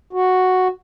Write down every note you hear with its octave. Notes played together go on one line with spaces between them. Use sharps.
F#4